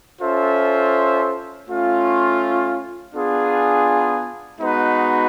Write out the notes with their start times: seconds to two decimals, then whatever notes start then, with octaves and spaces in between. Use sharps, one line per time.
0.21 C#4 F4 A4 C5 E5
1.67 A3 C#4 F4
3.13 B3 D4 F4 G#4
4.60 G#3 B3 D#4 F#4 B4